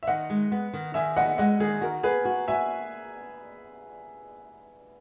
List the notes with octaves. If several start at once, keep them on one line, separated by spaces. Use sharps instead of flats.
E5
D#3 D#5 F#5
G#3
B3
D#3
D#3 E5 G#5
B3 D#5 F#5
G#3 D#5 F#5
D#3 G#4
F#4 A#4
B3 G#4 B4
F#4
F#4 E5 G#5